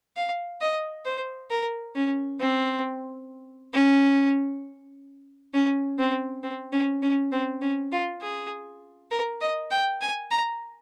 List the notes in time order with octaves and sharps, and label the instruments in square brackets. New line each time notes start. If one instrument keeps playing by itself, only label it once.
[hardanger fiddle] F5
D#5
C5
A#4
C#4
C4
C#4
C#4
C4
C4
C#4
C#4
C4
C#4
F4
G#4
A#4
D#5
G5
G#5
A#5